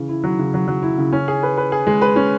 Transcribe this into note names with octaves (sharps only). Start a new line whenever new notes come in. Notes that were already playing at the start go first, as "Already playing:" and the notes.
Already playing: C#3 E3
E4
F#3
C#3
F#3
F#3
E4
C#3
C#4
G#4
B4
B4
G#4
G#3
B4
C#4